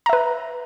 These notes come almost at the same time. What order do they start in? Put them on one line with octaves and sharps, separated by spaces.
A#5 E5 B4